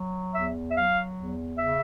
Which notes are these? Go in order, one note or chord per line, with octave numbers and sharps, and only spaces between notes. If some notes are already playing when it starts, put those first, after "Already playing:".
Already playing: F#3
E2 E5
E5
F#3 F5
E2
C#3 E5